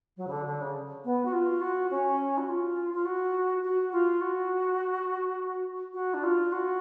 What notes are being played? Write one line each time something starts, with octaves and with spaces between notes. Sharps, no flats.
F#3
C#3
D3
D3
C#3
B3
F#4
F4
F#4
C#4
F#4
F4
F4
F#4
F#4
F4
F#4
F#4
D4
F4
F#4